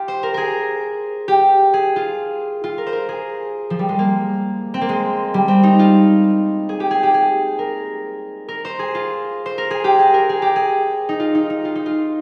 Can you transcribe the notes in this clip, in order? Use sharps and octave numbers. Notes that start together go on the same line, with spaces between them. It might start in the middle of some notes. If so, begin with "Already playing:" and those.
Already playing: F4 G4
C5
A#4
G#4 A#4
G4
G#4
F4
F4
A#4
C5
A#4
G#4
F3
G3
G#3
A#3
C4
A#3
G#3
G3
C4
D#4
F4
G#4
G4
G#4
G4
G#4
A#4
A#4
C5
G#4
F4
C5
A#4
G#4
G4
G#4
A#4
G#4
G4
G#4
D#4
F4
D#4
D#4
F4
D#4
F4